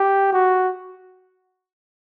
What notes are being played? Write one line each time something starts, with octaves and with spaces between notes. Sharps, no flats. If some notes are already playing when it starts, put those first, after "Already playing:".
Already playing: G4
F#4